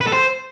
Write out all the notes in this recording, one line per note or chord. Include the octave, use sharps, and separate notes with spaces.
B4
A4
C5